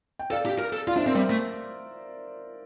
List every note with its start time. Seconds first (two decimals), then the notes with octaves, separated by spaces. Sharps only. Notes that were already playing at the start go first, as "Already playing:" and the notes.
0.19 G5
0.31 A4 D5 F5
0.46 G4
0.59 A#4
0.73 A4
0.87 F4 D5 F5
0.96 D4 C5 E5
1.06 C4 A#4 D5
1.15 G3 C5 E5
1.30 A3